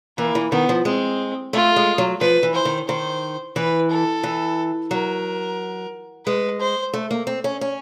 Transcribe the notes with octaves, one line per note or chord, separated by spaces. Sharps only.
E3 A#3
E3
D#3 B3
F3
G#3 C4
A3 F4
G#3
F#3
F3 B4
E3
C5
D#3
D#3 C5
E3 B4
A4
E3
F#3 A#4
G#3 B4
C5
A3
A#3
C4
C#4
C#4